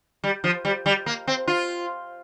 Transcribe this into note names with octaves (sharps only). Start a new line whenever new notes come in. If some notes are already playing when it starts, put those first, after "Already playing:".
G3
F3
G3
G3
A#3
C4
F4